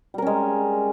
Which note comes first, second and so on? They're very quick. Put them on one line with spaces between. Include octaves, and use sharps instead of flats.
G3 A#4 C#4 G#3